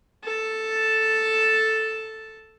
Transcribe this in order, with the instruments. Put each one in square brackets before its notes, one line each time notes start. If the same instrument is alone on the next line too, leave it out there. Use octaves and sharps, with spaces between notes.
[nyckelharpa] A4 A5